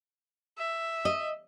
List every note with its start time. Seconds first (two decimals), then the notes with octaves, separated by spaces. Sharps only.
0.58 E5
1.05 D#5